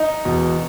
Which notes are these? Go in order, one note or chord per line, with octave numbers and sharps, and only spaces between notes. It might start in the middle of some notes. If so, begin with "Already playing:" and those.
Already playing: D#4
E1 E2 B2